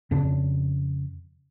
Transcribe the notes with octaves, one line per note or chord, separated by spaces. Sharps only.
F2 C#3 D4